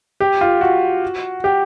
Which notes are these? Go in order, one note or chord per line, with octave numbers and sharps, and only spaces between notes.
G4
F4
F#4
G4